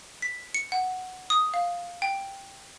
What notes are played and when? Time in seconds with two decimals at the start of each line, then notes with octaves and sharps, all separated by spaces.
0.22 B6
0.54 C#7
0.72 F#5
1.30 D#6
1.54 F5
2.02 G5